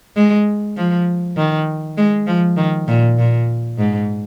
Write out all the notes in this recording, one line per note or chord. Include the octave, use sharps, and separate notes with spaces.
G#3
F3
D#3
G#3
F3
D#3
A#2
A#2
G#2